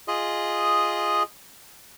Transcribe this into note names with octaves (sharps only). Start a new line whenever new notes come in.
F4 G#4 D#5